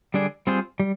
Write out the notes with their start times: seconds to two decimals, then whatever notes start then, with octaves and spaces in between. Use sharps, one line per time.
0.14 D3 G3 D4 G#4 D5
0.47 G3 C4 F4 G#4 C5
0.80 G3